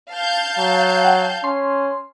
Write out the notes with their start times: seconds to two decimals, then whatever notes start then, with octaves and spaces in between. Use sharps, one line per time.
0.12 F5 A5 G6
0.59 F#3
1.05 F#5 G5
1.44 C#4 C6